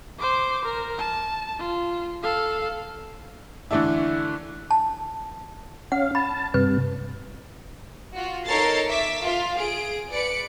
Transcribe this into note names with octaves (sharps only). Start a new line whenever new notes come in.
C5 D6
A#4
A5
F4
A4 F5
D3 E3 A3 D4 E4
A5
C#4 F5 F#5
A5 B5
G2 C3 B4
F4 F#4
D#4 A4 A#4 C#5 A6 C7
E5 D6 B6
F4 F5
G#4 D7
B4 D5 C#7 D7